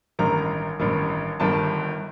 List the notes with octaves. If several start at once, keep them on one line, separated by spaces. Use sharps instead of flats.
A1 G2 D#3 A#5
A1 G2 D#3
G1 G2 D#3 A5